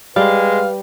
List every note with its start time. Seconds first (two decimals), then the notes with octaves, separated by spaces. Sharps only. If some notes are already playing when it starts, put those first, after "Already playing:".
0.16 G3 G#3 B4 F5